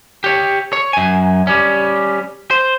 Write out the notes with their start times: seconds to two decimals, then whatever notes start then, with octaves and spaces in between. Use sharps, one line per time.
0.24 G4 C#5
0.73 C#5
0.93 F#2 G#5
1.47 G3 C#4
2.51 C5